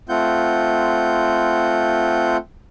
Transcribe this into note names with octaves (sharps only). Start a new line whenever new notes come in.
A3 C4 F4 F#5 G6